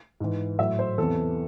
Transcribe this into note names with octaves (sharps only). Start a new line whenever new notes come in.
G#2 E3
A2 F#3 E5
C5
E2 C3 E3 A4